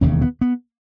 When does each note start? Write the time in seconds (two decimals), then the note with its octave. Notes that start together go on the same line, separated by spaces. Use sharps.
0.01 E1 D#2 C#3 C#4
0.21 B3
0.41 B3